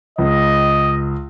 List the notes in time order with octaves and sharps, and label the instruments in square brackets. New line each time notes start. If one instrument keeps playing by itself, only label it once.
[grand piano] C#2 [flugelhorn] D#5